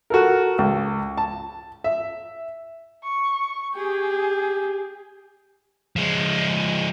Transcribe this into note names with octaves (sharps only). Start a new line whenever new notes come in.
F#4 A4 A#4
C#2
A5
E5
C#6
G4 G#4
F3 G#3